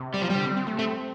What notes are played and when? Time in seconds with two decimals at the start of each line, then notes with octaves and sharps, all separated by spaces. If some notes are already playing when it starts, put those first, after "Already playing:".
Already playing: C3
0.14 G3
0.22 F3
0.30 G3
0.35 D3
0.46 C4
0.57 C4
0.67 A3
0.78 A3 C4